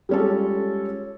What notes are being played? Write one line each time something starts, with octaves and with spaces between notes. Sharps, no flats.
G3 G#3 C#4 F4 A4